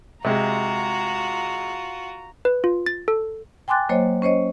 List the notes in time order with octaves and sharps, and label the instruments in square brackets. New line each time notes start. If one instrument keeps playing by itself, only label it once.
[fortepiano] C3 G#3 [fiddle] F4 F#4 [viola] A#5
[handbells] B4
F4
A6
A4
[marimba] G5 G#5 C6 D6 F#6 A6
F#3 A#3 C5 C#5 D#5
C#4 C5 C#5 D#5